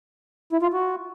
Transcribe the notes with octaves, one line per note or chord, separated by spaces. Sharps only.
E4
F4
F#4